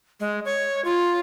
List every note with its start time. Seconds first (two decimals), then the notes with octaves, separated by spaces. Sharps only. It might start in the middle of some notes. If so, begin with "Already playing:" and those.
0.20 G#3
0.45 C#5
0.85 F4